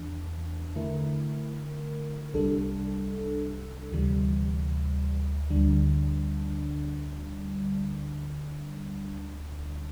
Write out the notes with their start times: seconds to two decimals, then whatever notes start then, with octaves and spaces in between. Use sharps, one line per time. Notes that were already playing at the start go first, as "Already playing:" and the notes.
Already playing: E2 E3 D4
0.75 D3 A3 E4 A#4
2.33 C2 C3 G3 D4 A4
3.92 D2 C3 E3 G3
5.50 D2 D3 G3 D4